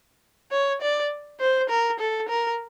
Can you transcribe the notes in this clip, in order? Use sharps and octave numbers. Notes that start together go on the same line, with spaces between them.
C#5
D5
C5
A#4
A4
A#4